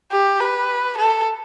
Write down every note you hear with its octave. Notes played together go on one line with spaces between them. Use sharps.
G4
B4
A4